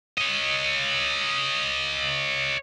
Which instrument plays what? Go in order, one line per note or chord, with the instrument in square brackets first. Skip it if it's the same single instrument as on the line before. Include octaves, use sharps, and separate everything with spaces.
[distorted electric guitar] C#5 D#5